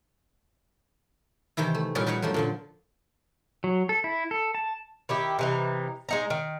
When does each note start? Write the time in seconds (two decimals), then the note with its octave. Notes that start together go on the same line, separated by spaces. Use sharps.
1.57 C3 D#3 E3 E4
1.74 A3
1.95 A#2 G3 C#4 D#4 F#4 A#4
2.06 G3 D#4 A#4 B4 C#5 F#5
2.22 F#2 F3 A3 D4
2.34 A#2 D3 F3
3.64 F#3
3.89 A4
4.04 E4
4.31 A4
4.55 A5
5.09 D#3 E4 G4
5.39 C3 E3 D#4
6.09 G#3 D#4 A#5
6.30 D#3